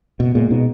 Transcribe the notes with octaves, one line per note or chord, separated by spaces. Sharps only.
B2 B3
A#2 G#3
B2 D#4